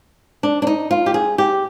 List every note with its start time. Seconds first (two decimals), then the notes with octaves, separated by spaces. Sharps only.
0.43 D4
0.62 D4
0.67 D#4
0.91 F4
1.06 G4
1.14 G#4
1.38 G4